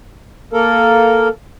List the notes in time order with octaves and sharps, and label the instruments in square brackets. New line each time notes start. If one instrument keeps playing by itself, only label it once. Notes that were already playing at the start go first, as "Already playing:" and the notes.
[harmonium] A#3 A4 A#4